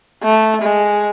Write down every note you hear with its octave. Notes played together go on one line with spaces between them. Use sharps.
A3
G#3